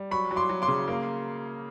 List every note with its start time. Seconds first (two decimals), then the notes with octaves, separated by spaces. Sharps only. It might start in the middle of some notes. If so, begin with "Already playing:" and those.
Already playing: G3
0.11 F#3 B5 C#6
0.31 F#3
0.36 C6 D6
0.49 F#3
0.62 C6 D6
0.68 C#3
0.88 A#3